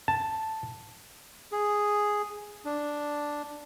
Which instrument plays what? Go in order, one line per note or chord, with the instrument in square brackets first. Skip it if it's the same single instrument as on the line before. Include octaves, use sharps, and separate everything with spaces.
[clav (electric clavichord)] A5
[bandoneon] G#4
D4